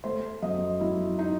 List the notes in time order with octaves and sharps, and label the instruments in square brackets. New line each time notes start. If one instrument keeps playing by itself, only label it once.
[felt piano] A3 C5
F#2 D#5
F#3 E4
D#4